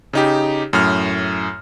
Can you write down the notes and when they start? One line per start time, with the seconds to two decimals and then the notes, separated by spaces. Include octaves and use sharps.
0.13 C#3 D#4 G4
0.73 F#2 A2 F6